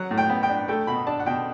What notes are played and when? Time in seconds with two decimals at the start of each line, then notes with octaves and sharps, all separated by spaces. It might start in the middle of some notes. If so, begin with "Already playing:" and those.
Already playing: F#3 F#5
0.11 A2
0.18 G5
0.30 B3
0.43 G5
0.49 D4
0.68 A3 G5
0.87 B2 B5
1.07 D4 A5
1.20 F#5
1.26 B2 G5